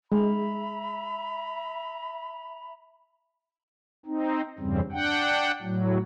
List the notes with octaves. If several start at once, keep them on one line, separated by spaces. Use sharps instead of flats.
G#3 E5 A#5 B5
C4 D#4
E2 G2 C#3 G3 C4
D4 F#5 G5
A2 F#3